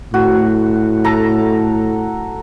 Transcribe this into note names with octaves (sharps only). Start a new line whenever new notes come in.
A2 F#4
A4 A5 A#5